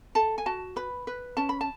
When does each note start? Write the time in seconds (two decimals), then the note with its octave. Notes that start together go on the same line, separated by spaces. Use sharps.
0.15 A4 A5
0.38 G#5
0.46 F#4 A5
0.76 B4 B5
1.07 B4
1.37 C#4 A5
1.49 B5
1.61 A5